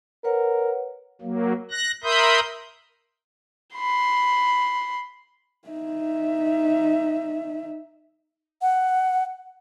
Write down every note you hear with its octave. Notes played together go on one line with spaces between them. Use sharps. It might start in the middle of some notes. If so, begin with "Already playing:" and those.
A#4 B4 C#5 F#5
F#3 A#3
F#6 A#6
A#4 E5 B5 C6 D#6 G6
B5 C6
D#4 E5
F#5